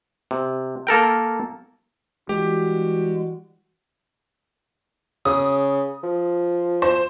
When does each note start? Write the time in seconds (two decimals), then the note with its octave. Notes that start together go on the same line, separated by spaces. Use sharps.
0.31 C3
0.87 A#3 A4 A#4 G5
2.29 E3 G3 G#3 F#4 G4
5.25 C#3 D#6
6.03 F3
6.82 C5